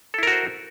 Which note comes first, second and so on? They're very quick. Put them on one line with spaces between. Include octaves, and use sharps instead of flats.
A4 E4 A#4 F#4 C5